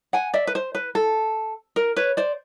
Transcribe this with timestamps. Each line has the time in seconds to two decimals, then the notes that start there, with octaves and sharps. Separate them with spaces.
0.13 F#5 G#5
0.34 D5 E5
0.47 B4
0.55 C5
0.75 B4
0.95 A4
1.76 A#4
1.96 B4 C#5
2.17 C5 D5